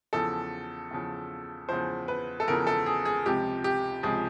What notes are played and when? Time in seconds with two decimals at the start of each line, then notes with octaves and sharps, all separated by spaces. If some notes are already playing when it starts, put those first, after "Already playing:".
0.13 E2 C#3 F3 A4
0.91 E2 C#3 F3
1.69 E2 C#3 F3 C5
2.08 B4
2.40 A4
2.48 E2 C#3 F3 A#4
2.67 A4
2.86 G#4
3.05 G#4
3.26 C#2 C3 F3 G4
3.64 G4
4.03 C#2 C3 F3 G#4